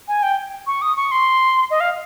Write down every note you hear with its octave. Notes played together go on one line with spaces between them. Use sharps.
G#5
G5
C#6
D#6
C#6
C6
D#5
F5